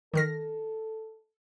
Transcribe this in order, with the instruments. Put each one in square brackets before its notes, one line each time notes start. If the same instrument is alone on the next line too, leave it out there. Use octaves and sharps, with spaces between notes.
[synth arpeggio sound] D#3 F6 A#6 [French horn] A4